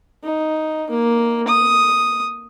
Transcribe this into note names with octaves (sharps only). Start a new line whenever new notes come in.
D#4
A#3
D#6